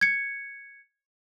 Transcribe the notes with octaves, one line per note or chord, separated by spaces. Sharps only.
G#6 C#7